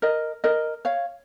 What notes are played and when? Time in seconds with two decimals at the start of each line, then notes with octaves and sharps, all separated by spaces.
0.02 A#4 D#5
0.44 A#4 D#5
0.85 C#5 F5